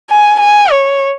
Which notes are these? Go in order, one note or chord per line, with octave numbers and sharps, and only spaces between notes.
G#5
G#5
C#5